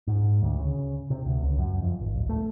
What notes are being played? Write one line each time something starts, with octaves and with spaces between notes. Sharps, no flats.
G#2
D2
C#3
C3
D2
C#2
F#2
F2
G#1
D1
A3